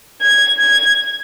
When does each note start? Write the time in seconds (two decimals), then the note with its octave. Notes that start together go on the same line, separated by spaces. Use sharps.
0.22 G#6
0.60 G#6